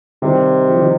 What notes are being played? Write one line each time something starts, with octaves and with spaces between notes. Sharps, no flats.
C3 D#3 G3
F3
D#3